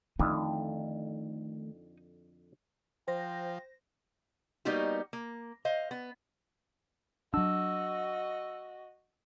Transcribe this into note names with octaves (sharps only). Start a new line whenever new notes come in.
F2 D3 D#3 A3 D#4 E4
F3 C5 G5 A#6
G3 A#3 B3 D#4 F#4 G4
A#3
C5 D#5 F5
B3
F#3 D4 F#4 D#5 E6